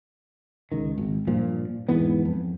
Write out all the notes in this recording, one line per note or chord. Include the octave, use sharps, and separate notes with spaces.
C#2 D#3
G#1
G2 A#2 F3
E2 G#2 E3 B3
F2